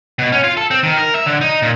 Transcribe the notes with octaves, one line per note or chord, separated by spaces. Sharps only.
B2
C#4
F4
A4
C4
D#3
A#4
E5
D3
D#4
A#2